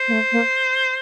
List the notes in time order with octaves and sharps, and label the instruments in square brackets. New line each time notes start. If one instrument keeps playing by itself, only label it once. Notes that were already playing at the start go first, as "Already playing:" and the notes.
Already playing: [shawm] C5
[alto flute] A#3
A3
A#3